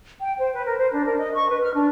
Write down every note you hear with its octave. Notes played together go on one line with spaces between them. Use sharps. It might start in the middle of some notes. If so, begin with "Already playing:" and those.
G5
C5
B4
A#4
C5
D4
A#4
D#5
C#6
B4
F6
D4